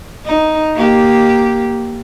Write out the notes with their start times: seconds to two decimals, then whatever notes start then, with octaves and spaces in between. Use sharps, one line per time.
0.25 D#4
0.75 A#3 G4